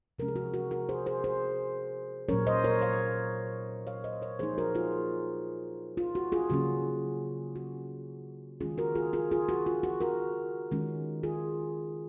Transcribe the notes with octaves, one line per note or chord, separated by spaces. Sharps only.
C3 F3 G#3 C#4 A#4
G#4
F#4
F#4 A#4
F#4 A#4
G#4 C5
G#4 C5
G#4 C5
A#2 F#3 C#4 A#4 C#5
C5 D#5
A#4 C#5
C#5 F5
C#5 F5
C5 D#5
A#4 C#5
F3 A#3 D#4 G#4 C5
F#4 A#4
F4 G#4
F4
F#4
F4 G#4
C#3 F#3 A#3 C#4 F#4
F#4
D#3 G#3 C#4 F4 G#4
F#4 A#4
F4 G#4
F4 G#4
F4 G#4
F#4
F4
F#4
F#4 A#4
D#3 G#3 C#4
F4 G#4